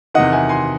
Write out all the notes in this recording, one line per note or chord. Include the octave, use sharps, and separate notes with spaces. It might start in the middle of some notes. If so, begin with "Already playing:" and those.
E2 C3 D#3 D#5 F#5
E5 G#5
G#5 C6